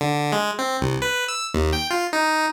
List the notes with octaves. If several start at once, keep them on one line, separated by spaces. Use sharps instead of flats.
D3
G#3
C4
C2
B4
E6
D#2
G5
F4
D#4